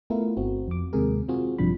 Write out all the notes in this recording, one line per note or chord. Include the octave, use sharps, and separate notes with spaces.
A3 B3 E4 F4 A#4
G1 C4 F#4
F2 D6
D#2 C3 G#3 G#4 A#4
C4 F4 F#4 G#4
A1 G2 C3 F3 D4 B5